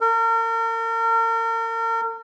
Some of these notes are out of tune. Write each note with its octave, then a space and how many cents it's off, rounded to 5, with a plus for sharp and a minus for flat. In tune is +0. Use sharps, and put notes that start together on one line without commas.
A#4 -40